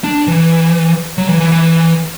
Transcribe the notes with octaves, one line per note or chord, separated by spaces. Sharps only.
D4
E3
F#3
E3
E3
E3